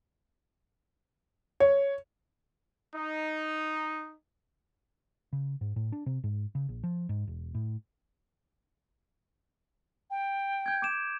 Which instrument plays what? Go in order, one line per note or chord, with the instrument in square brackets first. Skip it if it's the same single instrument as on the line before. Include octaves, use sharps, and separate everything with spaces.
[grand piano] C#5
[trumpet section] D#4
[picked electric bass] C#3
G#2
A2
D4
C3
G#2
C#3
A#1
F3
G#2
E1
A2
[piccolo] G5
[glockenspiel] G6 G#6
D6 D7 E7